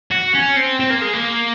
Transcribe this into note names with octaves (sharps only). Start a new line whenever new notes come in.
F#4
C#4
C4
C4
A#3
G#3
A#3